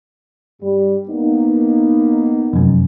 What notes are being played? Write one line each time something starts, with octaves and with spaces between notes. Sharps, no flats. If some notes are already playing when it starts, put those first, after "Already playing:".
G2 G3
A#3 B3 D#4
F1 F#2